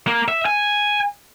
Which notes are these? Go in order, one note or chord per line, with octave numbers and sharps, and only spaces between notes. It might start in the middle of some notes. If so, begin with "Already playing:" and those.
A#3
E5
G#5